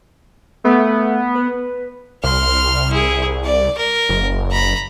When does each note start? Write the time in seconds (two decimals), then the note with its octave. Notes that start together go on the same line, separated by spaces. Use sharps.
0.65 A3 B3
1.35 B4
2.24 C2 C6 F6
2.91 E4 G#4
3.44 D5
3.78 A#4
4.09 F#1
4.51 A#5 B5